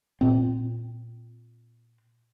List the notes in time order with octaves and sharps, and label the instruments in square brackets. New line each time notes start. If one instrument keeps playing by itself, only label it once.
[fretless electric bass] A#2 C4